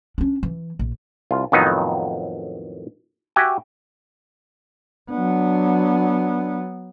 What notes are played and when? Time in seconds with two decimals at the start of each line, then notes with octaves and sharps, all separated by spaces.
0.18 C#4 D4
0.43 E3
0.79 A#1
1.31 C2 F4
1.52 F2 A2 D#3 F#3 B3 D#4
3.36 F#4 G4 E5 G5 G#5
5.10 F#3 B3 D4